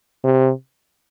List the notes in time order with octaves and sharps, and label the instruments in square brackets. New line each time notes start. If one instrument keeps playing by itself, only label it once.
[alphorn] C3